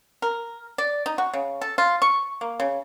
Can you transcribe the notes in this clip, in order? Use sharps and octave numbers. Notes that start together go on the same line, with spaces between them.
A#4
D5
D#4
F#4
C#3
A4
F4
C#6
A#3
C#3